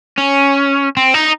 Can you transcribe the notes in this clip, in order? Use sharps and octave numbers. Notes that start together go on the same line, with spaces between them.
C#4
C4
D#4